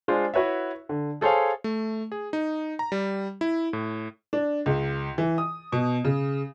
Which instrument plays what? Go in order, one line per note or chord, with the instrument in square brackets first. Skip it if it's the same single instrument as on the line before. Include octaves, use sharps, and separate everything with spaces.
[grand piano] G#3 D4 F4 C5
E4 F#4 B4 C#5 E5
D3
G#4 A4 C5 C#5 F5
[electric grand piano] A3
G#4
D#4
A#5
G3
E4
A2
[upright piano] D4
C#2
E3
D#6
B2
C#3